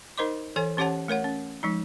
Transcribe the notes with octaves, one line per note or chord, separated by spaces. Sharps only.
D#4 A#4 C5 D#5 C6 D6
E3 A4 C#5 G#5
E3 C#4 G4 C#5 F#5 A5
A3 A#4 C#5 F#5
C#4
F3 G#3 D#4